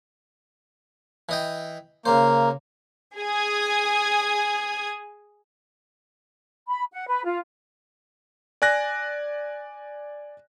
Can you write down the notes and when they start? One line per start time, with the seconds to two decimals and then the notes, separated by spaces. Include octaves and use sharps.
1.29 E3 D#5 G5
2.06 C#3 A#3 C5
3.17 G#4 G#5 D#6 G#6
6.68 B5
6.92 F#5
7.07 B4
7.25 F4
8.62 D5 G#5 F#6 A#6